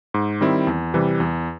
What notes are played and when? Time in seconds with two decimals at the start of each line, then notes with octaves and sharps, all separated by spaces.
0.14 G#2
0.41 D#3 G3 C4 E4
0.67 E2
0.94 C3 E3 G3
1.20 E2